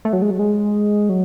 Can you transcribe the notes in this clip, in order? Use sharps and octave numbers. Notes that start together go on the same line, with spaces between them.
A3
F#3
G#3
F#3
G#3
F#3